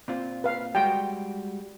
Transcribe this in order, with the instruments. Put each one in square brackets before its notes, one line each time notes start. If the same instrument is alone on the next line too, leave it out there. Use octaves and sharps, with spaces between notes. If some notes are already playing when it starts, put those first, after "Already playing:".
[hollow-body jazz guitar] A#2 C4 F4
[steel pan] B4 F5
[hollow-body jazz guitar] G3 G#3 F#4 [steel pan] G5